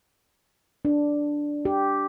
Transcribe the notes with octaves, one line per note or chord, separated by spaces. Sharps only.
D4
G4